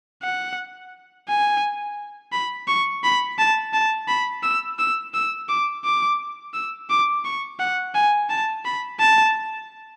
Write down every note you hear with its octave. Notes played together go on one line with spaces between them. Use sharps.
F#5
G#5
B5
C#6
B5
A5
A5
B5
E6
E6
E6
D6
D6
E6
D6
C#6
F#5
G#5
A5
B5
A5